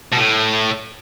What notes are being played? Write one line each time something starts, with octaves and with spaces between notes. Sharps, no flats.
B2
A2